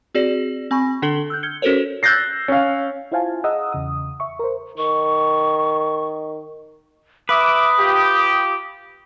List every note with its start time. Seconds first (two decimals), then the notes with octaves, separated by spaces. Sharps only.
0.15 C4 F#4 G#4 D5
0.71 C4 G#5 B5 C#6
1.02 D3 D4 A4 F#7 G7
1.30 E6 F#6 G6
1.43 F6 G6 G#6 C#7 G7
1.62 C#4 F#4 A4 A#4 C5 C#5
2.03 E6 F#6 G6 A6 A#6 C7
2.48 C#4 F5
3.12 E4 F4 C5 F5 G#5 A5
3.44 G#4 D#5 F#5 A#5 D#6 E6
3.72 E2 C#3 D#6
4.20 E5 C#6
4.39 A#4 C5
4.78 D#3 C#6
7.29 B4 E5 D6 D#6
7.79 F4 G4